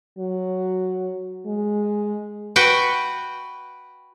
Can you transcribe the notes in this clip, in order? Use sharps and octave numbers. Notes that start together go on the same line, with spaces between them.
F#3
G#3
F#4 B4 G5